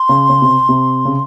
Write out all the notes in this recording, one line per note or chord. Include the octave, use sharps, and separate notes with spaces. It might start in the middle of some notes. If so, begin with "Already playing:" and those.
Already playing: C6
C#3
C#3
C3
C3
C#3